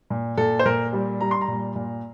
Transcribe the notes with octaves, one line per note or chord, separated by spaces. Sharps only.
A#2
A#2 A4
C5
A#2 A#4
G3
G3 A#5
C6
A#5
A#2
A#2